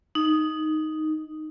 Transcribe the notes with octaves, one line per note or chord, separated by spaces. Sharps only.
D#4